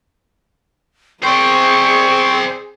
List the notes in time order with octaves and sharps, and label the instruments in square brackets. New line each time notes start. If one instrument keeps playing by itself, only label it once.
[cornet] C4 [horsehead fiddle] G#4 [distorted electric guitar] C5 D5 [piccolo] C#6